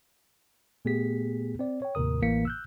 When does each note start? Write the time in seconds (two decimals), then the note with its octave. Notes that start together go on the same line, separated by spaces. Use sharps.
0.85 A#2 A3 B3 G4 G#4 B6
1.59 C4 D5
1.82 C#5 G5
1.95 D#2 A2 C3 A#4 D#6
2.22 A1 A2 E3 A#3 B6 C#7
2.45 E6 F#6 G6